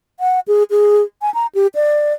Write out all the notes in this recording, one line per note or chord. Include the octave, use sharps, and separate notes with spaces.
F#5
G#4
G#4
G#5
A#5
G4
D5